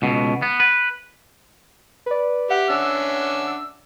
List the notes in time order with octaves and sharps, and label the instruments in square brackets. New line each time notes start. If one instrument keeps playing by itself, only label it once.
[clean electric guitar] C#2 B2
B3
B4
[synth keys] B4 D5
[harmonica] G4 [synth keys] E5 F#5
[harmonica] C#4 D4 E6